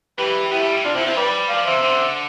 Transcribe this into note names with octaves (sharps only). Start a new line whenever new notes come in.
E3 G4 B4
B3 E4 G4
A3
G3
E3
C3 D4 F4
D3 C4 E4
F3 C4 E4
G3 B4 D5
F3 D5 F5
E3 C5 E5
C3
D3 C5 E5